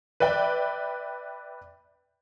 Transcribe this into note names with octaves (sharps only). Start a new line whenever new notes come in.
B4 D5 E5 G5